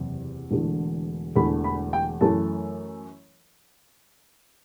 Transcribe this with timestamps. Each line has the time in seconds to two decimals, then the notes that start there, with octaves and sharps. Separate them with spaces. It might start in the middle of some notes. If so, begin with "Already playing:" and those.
Already playing: F#1 E2 C3
0.50 E1 E2 D3 A3
1.36 E1 E2 D3 A3 B5
1.64 B5
1.93 G5
2.21 F#2 E3 A3 A5